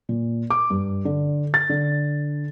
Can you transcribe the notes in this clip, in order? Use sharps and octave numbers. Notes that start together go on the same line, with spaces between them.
A#2
D6
G2
D3
A6
D3